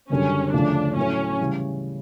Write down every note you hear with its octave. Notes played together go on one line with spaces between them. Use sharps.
F#1 F#2 D3 G3 C#4
D2 C#3 F3 A3 C#4 D4
A2 F#3 A3 C#4
C#3 E3 G3